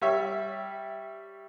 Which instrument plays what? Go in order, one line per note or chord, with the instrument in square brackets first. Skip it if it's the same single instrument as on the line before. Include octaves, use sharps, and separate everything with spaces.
[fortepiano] G3 C#5 E5